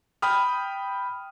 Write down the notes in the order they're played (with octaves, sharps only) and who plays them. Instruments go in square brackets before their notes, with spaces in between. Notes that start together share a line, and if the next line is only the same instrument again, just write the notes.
[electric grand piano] G5 B5 D#6 F6